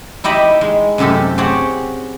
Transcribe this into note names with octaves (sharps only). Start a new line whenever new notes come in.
D#4 E4 G4 D#5 B5
G#3
F#2 C3 A3 G4 A4
C4 G4 G#4 C#5 F#5